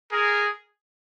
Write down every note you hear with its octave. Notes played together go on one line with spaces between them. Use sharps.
G#4 A#4